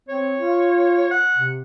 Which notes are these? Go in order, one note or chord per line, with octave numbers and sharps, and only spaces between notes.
C4 C#5
F4
F#5
C3